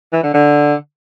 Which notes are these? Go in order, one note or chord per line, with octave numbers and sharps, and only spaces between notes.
E3
D3
D3